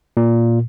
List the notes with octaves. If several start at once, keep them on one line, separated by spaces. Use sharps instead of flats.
A#2